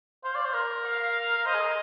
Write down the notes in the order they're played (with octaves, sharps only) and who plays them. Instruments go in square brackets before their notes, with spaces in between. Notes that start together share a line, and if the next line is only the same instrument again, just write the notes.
[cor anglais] C5 [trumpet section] F5
[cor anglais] D5
C5
A#4
[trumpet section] F5
[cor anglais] A#4
[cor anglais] C5 [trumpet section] D#5
[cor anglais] G#4
A#4